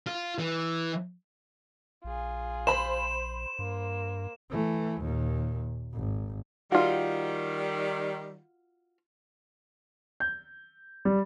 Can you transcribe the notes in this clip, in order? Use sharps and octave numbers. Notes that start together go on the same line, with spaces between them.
F4
E3
A#1 F4 G#4
C5 B5 E7
G2 A#3
E3 A3
D#2 A#2
G#1
D#3 G3 F4 F#4
G6
G3